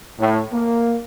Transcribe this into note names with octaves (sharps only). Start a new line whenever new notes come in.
A2
A#3